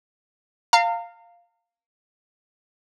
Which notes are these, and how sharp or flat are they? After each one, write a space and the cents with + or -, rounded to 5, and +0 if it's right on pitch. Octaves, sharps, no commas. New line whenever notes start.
F5 +0 A#5 -35